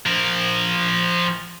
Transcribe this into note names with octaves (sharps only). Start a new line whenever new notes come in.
F3 A#4